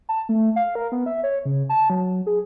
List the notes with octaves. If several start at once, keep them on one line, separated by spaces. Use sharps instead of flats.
A5
A3
F5
A#4
B3
E5
C#5
C#3
A5
F#3
G#4